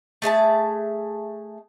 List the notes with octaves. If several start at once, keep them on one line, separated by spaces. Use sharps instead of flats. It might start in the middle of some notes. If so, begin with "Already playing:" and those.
A3 G#4 E5 A5